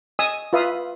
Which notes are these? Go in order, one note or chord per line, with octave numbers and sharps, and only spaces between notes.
D#5 G#5 D#6 E6
F4 B4 E5 F5 D#6